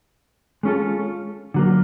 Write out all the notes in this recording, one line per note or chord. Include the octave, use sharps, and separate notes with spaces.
G#3 C#4 F4 A4
D3 F#3 A#3